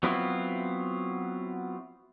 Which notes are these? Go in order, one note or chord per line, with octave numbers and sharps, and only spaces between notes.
F#3 B3 C4 E4 F4